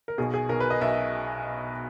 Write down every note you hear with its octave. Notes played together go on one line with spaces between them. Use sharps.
A#4
B1 B2 G#4
G#4
B1 B2 A#4
B4
D#5
B1 B2 E5